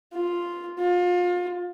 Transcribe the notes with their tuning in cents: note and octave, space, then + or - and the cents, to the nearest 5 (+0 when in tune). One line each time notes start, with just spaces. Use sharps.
F4 +0
F4 +30